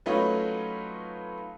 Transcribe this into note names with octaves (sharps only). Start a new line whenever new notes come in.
F#3 A3 C#4 D#4 F4 B4